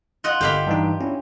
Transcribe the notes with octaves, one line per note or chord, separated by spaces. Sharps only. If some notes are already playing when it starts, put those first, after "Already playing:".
F4 D#5 F#5
G1 G4 F5 B5
G2 E3 D#4
C#4 D4 E4